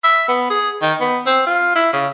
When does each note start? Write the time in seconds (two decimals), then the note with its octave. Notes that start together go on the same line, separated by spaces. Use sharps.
0.04 E5
0.28 B3
0.50 G#4
0.82 D#3
1.01 B3
1.26 C4
1.46 F4
1.75 E4
1.93 C#3